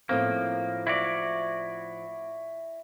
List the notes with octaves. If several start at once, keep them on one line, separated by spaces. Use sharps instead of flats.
A2 F3 A#3 C4
E4 F#4 D5